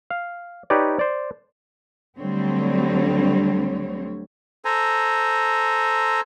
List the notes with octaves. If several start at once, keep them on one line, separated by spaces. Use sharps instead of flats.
F5
D#4 G4 B4 C#5 D5
C5 D5
D2 D3 F#3 G3 C4 C#5
A4 C5 G#5 A#5